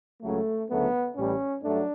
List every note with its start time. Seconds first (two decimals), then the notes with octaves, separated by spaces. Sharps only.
0.22 C#2 C#3 F#3 A3
0.69 D2 C#3 F#3 A3 B3
1.16 A1 A2 E3 G3 C#4
1.63 G2 F#3 A3 D4